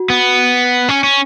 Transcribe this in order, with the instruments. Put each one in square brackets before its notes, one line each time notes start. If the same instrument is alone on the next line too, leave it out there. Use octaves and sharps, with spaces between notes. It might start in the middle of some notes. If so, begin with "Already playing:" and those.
Already playing: [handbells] F#4
[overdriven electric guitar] B3
C#4
C#4